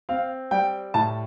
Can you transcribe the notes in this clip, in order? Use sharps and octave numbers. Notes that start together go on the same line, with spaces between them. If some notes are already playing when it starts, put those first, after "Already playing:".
C4 F5
G3 G5
A2 A5